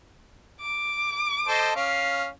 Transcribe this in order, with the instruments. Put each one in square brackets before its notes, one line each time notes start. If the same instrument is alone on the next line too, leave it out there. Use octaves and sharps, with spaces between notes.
[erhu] D6
[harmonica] A4 C5 D#5
C#4 F5